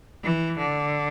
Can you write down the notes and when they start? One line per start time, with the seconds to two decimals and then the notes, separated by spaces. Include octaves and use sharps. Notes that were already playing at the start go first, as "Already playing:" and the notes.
0.24 E3
0.58 D3